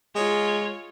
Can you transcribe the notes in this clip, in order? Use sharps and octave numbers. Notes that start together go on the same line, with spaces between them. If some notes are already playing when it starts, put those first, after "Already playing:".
G#3 F4 C#5